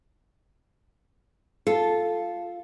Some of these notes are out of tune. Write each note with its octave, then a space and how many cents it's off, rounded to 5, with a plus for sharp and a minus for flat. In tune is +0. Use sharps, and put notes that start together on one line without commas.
F4 +0 A4 -5